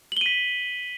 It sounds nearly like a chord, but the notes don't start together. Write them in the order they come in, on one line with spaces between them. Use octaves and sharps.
F#7 G7 D#7 B6